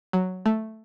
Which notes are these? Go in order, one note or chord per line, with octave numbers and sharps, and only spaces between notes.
F#3
A3